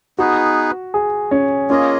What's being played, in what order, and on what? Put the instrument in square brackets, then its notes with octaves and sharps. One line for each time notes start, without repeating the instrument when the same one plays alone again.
[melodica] B3 D#4 G#4 B4 [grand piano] F#4
[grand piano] G#4
C#4
[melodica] A#3 F4 G#4 D#5 [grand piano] C#4